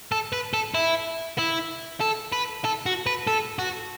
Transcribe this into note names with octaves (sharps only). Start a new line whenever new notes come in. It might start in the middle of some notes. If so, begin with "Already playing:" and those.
A4
B4
A4
E4
E4
A4
B4
A4
F#4
B4
A4
F#4